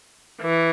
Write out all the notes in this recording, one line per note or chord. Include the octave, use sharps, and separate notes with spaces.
E3